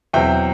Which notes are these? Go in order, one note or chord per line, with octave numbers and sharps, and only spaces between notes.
E2 B2 F#3 C4 E5 G5